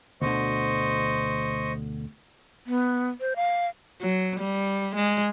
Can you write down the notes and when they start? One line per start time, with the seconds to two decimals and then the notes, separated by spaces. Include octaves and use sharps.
0.22 D2 B2 D3 C5 D#5 C#6
2.67 B3
3.21 C5
3.36 F5
4.01 F#3
4.40 G3
4.95 G#3